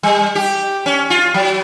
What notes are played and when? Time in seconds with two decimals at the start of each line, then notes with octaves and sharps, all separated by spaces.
0.03 G3
0.35 G4
0.86 C#4
1.10 F4
1.34 F#3